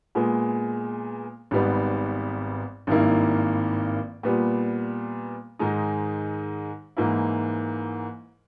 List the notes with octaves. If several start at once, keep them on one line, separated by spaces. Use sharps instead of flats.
A#2 G#3 B3
G#1 G#2 G3 B3
G#1 G2 D#3 A#3 E4
A#2 G3 B3
G#2 D#3 G#3 D#4
G#2 E3 A#3 E4